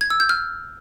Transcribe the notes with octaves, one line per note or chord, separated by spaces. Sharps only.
G#6
E6
G6
F6